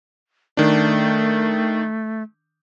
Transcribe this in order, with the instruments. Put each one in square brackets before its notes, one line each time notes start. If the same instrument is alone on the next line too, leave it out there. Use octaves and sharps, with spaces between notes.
[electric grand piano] D#3 D4 [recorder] A3